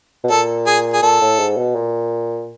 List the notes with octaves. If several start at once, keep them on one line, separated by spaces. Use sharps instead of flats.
B2
A#2 A4
G#4
G#4
A#2 A4
A2
G#2
B2
A#2